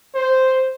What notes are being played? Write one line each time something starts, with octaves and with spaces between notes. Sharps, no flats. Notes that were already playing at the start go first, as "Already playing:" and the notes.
C5